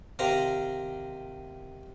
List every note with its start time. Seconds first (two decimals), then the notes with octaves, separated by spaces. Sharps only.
0.19 C3 D#3 F4 A#5